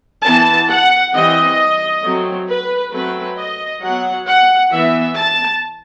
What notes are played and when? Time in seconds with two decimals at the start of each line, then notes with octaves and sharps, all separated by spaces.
0.24 E3 B3 A5
0.69 F#5
1.14 E3 G3 C4 D#5
2.03 F#3 A3 C4
2.49 B4
2.93 F#3 A3 C4 B4
3.38 D#5
3.82 F#3 B3 F#5
4.27 F#5
4.71 E3 B3 E5
5.17 A5